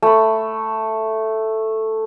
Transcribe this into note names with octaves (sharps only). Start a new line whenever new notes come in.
A3 B5